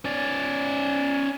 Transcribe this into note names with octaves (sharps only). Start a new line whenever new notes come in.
C#4 D5